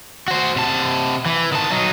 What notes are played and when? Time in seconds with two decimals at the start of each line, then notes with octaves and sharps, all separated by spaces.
0.28 F#4 C5
0.56 C3 A5
1.26 E3
1.52 D#3 A5
1.71 F#3 D#4